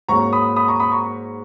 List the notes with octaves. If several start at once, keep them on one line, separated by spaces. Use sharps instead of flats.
G#2 F#3 A#3 A#5 C#6
B5 D#6
B5 D#6
A#5 C#6
B5 D#6
A#5 C#6